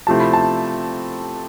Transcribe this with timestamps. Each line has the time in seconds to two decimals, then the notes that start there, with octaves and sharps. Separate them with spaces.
0.07 C3 F3 A3 C4 E4 A5
0.20 B5
0.33 A5